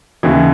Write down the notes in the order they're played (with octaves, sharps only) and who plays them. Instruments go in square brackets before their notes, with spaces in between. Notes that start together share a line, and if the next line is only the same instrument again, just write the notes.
[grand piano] D#2 C#3 E3 E4